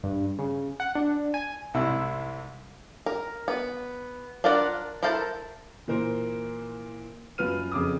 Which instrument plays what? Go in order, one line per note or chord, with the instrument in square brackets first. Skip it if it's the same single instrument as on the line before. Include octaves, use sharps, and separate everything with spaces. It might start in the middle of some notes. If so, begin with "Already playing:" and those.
[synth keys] G2
C#3
F#5
D4
G#5
[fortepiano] C2 G#2 C3 E4 E6
[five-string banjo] A#4
B3
D4 F4 A#4 D5 F#5
E4 A4 A#4 C5 A5
[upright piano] A#2 E3 A#4 C5
F#2 F#3 F4 B4 F6 D#7
F2 C#3 D6 D#6